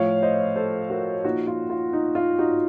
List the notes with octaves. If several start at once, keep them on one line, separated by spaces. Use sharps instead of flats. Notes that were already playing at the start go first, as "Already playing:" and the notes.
Already playing: A2 F3 C#5 F5
C5 D#5
A4 C5
F#4 A#4
A#2 F3 D#4 F#4
F4
F4
D#4
F4
D#4 F#4